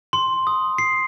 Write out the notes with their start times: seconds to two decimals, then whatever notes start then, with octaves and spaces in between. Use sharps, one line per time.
0.13 C6
0.47 D#6
0.78 C7